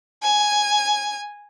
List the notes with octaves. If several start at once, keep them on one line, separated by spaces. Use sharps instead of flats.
G#5